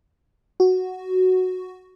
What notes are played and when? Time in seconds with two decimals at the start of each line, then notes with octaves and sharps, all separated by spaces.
0.60 F#4